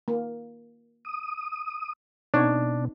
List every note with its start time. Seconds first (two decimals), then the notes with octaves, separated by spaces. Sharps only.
0.08 A#3
1.05 D#6
2.34 B2 C4 D4 D#4 C#5